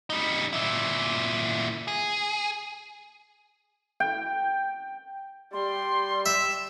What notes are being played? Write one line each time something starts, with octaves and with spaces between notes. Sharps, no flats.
G3 D#4
A#2 E4
G#4
G5
G3 C6
E5 E7